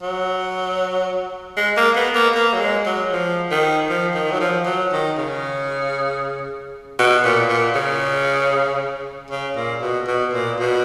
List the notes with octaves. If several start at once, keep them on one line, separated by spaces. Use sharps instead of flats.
F#3
G#3
A#3
B3
A#3
A#3
F#3
G#3
F#3
F3
D#3
F3
D#3
F#3
F3
F#3
D#3
C#3
B2
A#2
A#2
C#3
C#3
A#2
B2
B2
A#2
B2